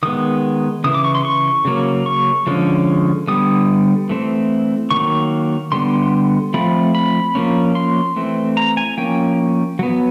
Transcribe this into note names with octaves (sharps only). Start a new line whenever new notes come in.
D#3 G#3 B3 D#6
C#3 E3 D#6
D6
C#6
C6
C#6
C#3 F#3 A#3 C#4
C#6
D3 F3 G#3 C#4
D3 G3 B3 D#6
E3 A3 C4
D#3 F#3 A#3 C#6
D3 G3 B3 C6
F3 A3 C4 B5
B5
F3 A#3 C#4
C6
E3 A3 C4
A#5
G#5
F3 A#3 C#4 G5
F#3 B3